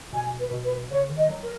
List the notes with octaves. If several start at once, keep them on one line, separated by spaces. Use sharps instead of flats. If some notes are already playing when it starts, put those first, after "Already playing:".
B2 G#5
B4
B2
B4
C#3 C#5
D#3
D#5
F#3
A#4